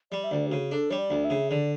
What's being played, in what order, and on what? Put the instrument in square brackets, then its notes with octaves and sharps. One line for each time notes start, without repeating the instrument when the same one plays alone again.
[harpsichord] G3 [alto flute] D5
[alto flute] E5
[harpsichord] D2 [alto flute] D5
[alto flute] G4
[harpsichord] C#3 [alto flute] F#4
[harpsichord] D4 [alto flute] A4
[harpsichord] G3 [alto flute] C#5
[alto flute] D5
[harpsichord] D2
[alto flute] E5
[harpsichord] C#3
[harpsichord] D3 [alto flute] D5